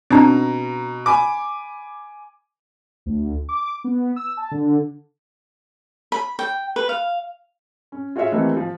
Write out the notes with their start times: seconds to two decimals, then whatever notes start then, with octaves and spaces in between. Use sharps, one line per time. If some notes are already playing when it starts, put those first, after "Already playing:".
0.10 B2 C4 D4 D#4 A#5
1.06 G#5 B5 D6
3.06 D2
3.49 D6
3.84 B3
4.16 E6
4.37 A5
4.51 D3
6.12 B5
6.39 G5
6.76 B4
6.89 F5
7.92 C#4
8.16 F4 F#4 G#4 C#5 E5
8.32 D#3 E3 A3 A#3 C4 G4
8.57 F3